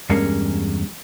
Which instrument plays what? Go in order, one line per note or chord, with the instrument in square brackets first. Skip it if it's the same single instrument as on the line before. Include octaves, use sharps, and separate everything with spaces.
[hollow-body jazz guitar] E2 G2 G#3 A#3 C#4